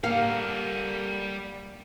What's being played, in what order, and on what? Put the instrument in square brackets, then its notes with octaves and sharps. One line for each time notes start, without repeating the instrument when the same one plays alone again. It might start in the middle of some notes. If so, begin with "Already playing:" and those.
[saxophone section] D3 A#4 [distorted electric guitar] G3 F#5 [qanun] A#3 [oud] F5